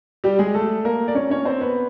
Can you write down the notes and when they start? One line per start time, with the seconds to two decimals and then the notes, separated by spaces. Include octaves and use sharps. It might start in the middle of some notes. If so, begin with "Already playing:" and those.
0.24 G3 G4
0.39 G#3 G#4
0.54 A3 A4
0.85 A#3 A#4
1.08 D5
1.15 C#4 C#5
1.30 C#4 C#5
1.45 C4 C5
1.61 B3 B4